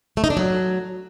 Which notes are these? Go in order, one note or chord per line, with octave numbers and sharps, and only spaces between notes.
A3
D#4
D4
F#3